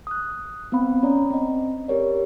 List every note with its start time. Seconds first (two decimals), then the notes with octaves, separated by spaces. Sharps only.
0.07 D#6 F#6
0.72 B3 C4 F5 B5
1.03 C#4 C#5 D5 A#5
1.30 C4 D#5
1.88 G4 A#4 C#5 D5